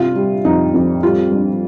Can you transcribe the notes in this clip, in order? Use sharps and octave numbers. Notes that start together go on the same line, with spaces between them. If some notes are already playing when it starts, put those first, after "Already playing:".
Already playing: G2 C3 F4
G3
F2 D#4
F2
G3 F4
G2